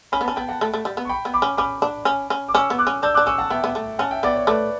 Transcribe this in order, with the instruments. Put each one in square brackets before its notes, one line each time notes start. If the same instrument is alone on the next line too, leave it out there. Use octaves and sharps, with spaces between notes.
[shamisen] C#4 [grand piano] B5
[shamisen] B3
[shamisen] C#4 [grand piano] A5
[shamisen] B3 [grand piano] G5
[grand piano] F#5 A5
[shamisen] A3
A3
G3
B3
[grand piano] C#6
G5 B5
[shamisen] B3
[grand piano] B5 D6
[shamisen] C#4
[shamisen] C#4 [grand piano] B5 D6
[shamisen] D4
C#4
C#4
[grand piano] D6
[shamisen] C#4 [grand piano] C#6 E6
[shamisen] B3
[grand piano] D6 F#6
[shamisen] C#4
[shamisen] D4 [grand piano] E6 G6
[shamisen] D4 [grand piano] D6 F#6
[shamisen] C#4 [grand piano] C#6 E6
[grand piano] F#5 A5
[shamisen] B3 [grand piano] E5 G5
[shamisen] B3
A3
[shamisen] C#4 [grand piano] F#5 A5
[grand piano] E5 G5
[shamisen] B3 [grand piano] D5 F#5
[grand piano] C#5
[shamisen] A3 [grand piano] B4 D5